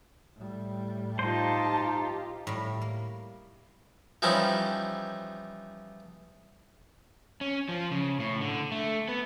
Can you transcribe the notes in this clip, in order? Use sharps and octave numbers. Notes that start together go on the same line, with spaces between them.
A2 G3
D#4 F4 G4 C5 A5
A2 G3
A#3
E3 F3 G3 C#4 D#4 E4
C#4
F3
C#3
A2
D3
A3
B3